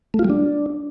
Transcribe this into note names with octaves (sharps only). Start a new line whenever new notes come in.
A3
F4
G3
D4